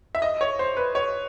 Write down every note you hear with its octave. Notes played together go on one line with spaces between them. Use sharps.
E5
D#5
C#5
C5
B4
C#5